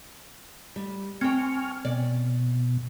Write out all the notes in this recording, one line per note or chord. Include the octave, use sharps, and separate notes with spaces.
G3
C4 G5 G#5 C#6 F6
B2 D5